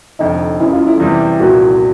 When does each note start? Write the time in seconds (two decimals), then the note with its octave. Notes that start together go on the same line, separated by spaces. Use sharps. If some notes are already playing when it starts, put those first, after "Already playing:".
0.19 F1 F2 D3 D#4
0.60 F#1 F#2 C#3 E4
0.73 F4
0.87 E4
1.00 E2 C3 E3 G3
1.40 C2 A#2 F3 A#3 F#4